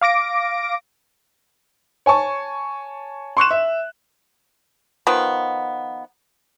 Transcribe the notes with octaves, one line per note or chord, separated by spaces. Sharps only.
F5 D6 A#6 D7
C#5 G#5 A5 C#6
C6 C#6 F#6 E7
E5
D#3 F3 B3